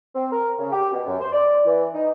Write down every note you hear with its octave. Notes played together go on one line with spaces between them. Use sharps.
C4
A#4
C#3
G4
B2
F#2
C5
D5
E3
D#4